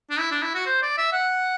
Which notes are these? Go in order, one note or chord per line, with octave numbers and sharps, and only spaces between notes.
D4
E4
D4
E4
F#4
C5
D5
E5
F#5